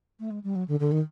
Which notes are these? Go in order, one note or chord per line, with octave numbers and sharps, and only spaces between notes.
A3
G#3
G3
F#3
D3
D3
D#3